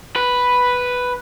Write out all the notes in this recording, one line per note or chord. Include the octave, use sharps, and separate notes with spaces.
B4